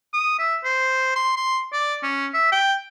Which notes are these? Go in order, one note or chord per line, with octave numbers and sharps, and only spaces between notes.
D#6
E5
C5
C6
C6
D5
C#4
E5
G5